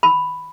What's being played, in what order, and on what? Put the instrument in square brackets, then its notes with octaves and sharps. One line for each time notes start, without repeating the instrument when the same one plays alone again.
[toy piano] B5